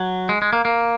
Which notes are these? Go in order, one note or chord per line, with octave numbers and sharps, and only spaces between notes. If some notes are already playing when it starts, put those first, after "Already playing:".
Already playing: F#3
G#3
G#3
A#3
A#3